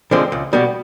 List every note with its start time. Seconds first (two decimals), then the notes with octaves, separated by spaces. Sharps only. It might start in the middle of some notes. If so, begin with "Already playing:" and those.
0.11 D3 F3 G#3 C4
0.32 C#2
0.53 B2 G3 B3